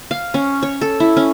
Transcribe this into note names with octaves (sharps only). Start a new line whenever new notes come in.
F5
C#4
C#5
A4
E4
C#4